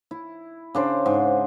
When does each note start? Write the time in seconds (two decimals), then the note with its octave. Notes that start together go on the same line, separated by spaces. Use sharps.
0.11 E4
0.75 C#3 D4 C5
1.06 G#2